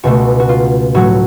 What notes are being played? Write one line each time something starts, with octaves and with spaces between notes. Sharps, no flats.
C#2 B2 A3 F#4
F#4
F4
A2 F#3 A3 F#4